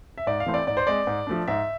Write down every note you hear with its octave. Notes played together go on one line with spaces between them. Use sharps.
E5
G#2 D5
F5
E3 A3 C4
D5
G#2 D5
C5
G#3 C4 D5
G#2
F3 A3 D4
G#2 E5